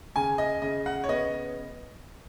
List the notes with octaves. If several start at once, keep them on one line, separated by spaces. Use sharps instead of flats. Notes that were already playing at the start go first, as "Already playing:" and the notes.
C#3 G#5
D#5
C#3 D#5
F#5
C#5
B3 D#5